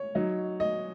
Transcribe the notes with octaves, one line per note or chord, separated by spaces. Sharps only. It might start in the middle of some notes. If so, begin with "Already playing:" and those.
Already playing: C#5
F#3 D#4
D#5